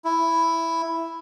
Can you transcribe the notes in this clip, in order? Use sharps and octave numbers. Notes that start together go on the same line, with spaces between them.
E4